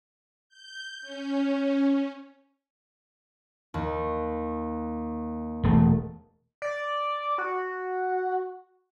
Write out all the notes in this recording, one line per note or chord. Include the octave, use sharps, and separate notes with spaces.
G6
C#4
D#2
E1 A3
D5
F#4